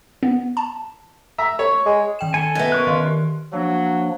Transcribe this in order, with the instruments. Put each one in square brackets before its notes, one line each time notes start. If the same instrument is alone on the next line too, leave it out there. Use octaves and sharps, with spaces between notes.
[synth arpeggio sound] B3
A5
[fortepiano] E5 A#5 E6
C#5
[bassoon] G#3
[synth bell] D#3 G5 E7
[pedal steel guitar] A4 G#5 [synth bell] C#7
[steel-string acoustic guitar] F#2 B3 [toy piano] D#5 E5 [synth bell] G#6
[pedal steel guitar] A#4 C#6 F#6
[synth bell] D#3 [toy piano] D#5 F5 C6
[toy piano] G4
[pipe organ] F3 A#3 D4 [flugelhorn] F#3